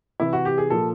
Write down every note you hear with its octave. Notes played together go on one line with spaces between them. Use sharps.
C3 E3 E4
F#4
G4
G#4
A#2 F3 A4